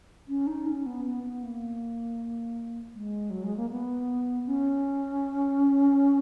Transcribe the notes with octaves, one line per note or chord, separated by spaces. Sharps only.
C#4
D#4
C#4
B3
B3
B3
A#3
G#3
F#3
G#3
A#3
B3
C#4